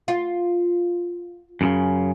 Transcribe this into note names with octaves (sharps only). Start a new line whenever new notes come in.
F4
F#2 A2 C#3